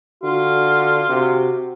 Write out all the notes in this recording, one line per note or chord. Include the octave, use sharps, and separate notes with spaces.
D3 F4 F#4
C3 F#4